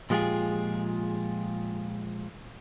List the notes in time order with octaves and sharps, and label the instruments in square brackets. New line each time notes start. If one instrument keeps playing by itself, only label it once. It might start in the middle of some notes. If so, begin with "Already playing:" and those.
[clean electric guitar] A#2 F3 G#3 F4 G4 G#4